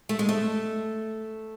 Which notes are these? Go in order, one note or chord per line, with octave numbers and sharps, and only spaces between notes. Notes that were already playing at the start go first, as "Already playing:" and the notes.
A3
G#3
A3